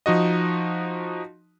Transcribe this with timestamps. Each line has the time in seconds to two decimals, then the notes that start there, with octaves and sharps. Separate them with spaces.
0.06 F3 D#4 F#4 D#5